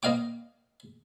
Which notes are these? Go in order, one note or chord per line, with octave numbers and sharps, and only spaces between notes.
A#3 D#5 F5 G5 D6